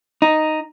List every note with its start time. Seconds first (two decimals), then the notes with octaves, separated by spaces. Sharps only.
0.22 D#4